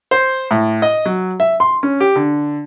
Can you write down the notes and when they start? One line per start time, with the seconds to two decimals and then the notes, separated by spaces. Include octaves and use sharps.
0.11 C5
0.51 A2
0.82 D#5
1.05 F#3
1.40 E5
1.60 C6
1.83 C#4
2.00 G4
2.16 D3